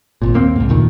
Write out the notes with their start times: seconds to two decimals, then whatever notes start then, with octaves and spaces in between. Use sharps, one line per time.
0.22 G#1 A#2
0.34 D#2 A#3 C4
0.56 C2 G#2
0.69 F1 D2 A#2 D#3